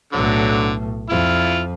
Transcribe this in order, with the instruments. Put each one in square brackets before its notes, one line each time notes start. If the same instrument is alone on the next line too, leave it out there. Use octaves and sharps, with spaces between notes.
[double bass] B1 A2 [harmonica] D3 F#3
[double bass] F2 [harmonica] E4 F4